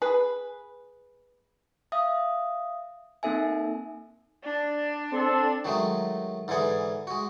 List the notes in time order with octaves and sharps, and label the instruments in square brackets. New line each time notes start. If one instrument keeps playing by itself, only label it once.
[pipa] G#4 B4
[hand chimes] E5 F5 D#6
A#3 C4 D#4 A4 E5 G#5
[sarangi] D4
[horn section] C4 A4
[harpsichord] D#3 F#3 G#3 A3
G#2 D3 E3 G#4 F#5
G#3 F#4